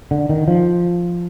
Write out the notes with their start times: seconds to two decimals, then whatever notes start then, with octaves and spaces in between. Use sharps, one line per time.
0.11 D3
0.29 D#3
0.48 F3